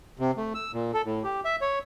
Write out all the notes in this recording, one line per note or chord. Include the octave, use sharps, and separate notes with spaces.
C3
A3
E6
A#2
A4
A2
G4
E5
C#5